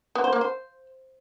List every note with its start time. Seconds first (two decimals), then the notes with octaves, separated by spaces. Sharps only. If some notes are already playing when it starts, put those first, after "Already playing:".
0.15 B3
0.24 C5
0.33 A#3
0.41 C5